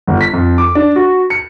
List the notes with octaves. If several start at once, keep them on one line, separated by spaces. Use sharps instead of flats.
G1
B6
F2
D6
D4
F#4
C#7